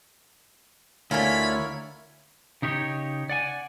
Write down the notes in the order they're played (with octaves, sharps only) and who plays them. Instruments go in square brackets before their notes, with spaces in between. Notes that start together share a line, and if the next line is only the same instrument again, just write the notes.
[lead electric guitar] D2 [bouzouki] D3 C#4 F4 [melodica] E4 A#4 C#5 [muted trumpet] B5
[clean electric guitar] C#3 D#4 G4 C#5
D5 F#5 G#5